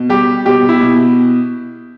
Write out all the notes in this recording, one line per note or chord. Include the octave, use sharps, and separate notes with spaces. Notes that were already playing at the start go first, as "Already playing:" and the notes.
Already playing: B2
G3 G4
B2 G4
E4
B2